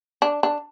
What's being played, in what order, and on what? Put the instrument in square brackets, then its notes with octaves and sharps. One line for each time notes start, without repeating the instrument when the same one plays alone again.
[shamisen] D4
D4